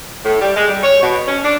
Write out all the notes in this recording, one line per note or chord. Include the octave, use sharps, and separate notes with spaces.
A2
G3
G#3
G3
C#5
B2
C#4
D4